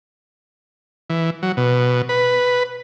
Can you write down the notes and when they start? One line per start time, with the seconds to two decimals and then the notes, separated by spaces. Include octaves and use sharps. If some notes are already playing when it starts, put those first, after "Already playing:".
1.10 E3
1.43 F#3
1.57 B2
2.09 B4